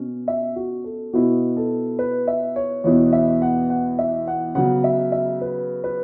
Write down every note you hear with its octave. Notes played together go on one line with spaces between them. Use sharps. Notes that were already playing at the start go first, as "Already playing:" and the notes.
Already playing: B2 C#4
E5
F#4
A4
B2 B3 E4 F#4
A4
B4
E5
C#5
E2 B2 B3 E4 C#5
E5
F#5
F#5
E5
F#5
C#3 F#3 B3 F#5
E5
E5
B4
B4